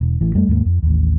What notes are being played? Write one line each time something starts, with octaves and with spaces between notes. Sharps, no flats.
E1
A1 E3
F2 G3 A3
D#2 G#2 G#3 A#3
F2
A1 D#2